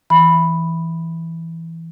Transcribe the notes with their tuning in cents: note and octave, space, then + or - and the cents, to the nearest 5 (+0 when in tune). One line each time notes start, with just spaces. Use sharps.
E3 +0 B5 +0